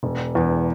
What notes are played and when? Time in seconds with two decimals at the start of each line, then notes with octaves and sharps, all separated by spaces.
0.03 E1
0.35 E2